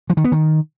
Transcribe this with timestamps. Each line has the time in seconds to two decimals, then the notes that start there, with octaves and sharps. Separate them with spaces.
0.10 F3
0.17 D#3
0.24 B3
0.32 D#3